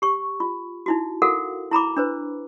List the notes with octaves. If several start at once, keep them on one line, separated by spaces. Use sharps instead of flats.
G4 C#6
F4
D#4 E4 F#4
F#4 A4 A#4 F5 F#5
E4 A#5 B5 D6
D4 B4 C5